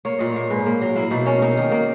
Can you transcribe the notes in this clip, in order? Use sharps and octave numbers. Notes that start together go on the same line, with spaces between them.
A#3 C#5
A#2 D#5
A#3 C#5
G#2 B4
A#3
F#3
A#3 E4
B2 D#4
A#3 C#4
A#3 D#4
D#3
A#3